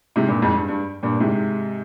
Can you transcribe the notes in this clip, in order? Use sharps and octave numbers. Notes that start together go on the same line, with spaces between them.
G#2 C3
G2 A#2
F2 G#2
G2
G2
G2 A#2
G#2 C3